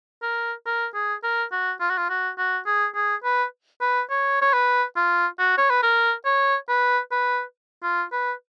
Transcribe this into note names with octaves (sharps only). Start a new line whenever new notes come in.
A#4
A#4
G#4
A#4
F#4
F4
F#4
F4
F#4
F#4
G#4
G#4
B4
B4
C#5
C#5
B4
F4
F#4
C#5
B4
A#4
C#5
B4
B4
F4
B4